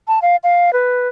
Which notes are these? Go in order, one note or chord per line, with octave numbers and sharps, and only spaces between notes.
A5
F5
F5
B4